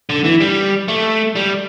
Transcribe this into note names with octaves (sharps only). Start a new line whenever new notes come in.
D3
E3
G3
A3
G3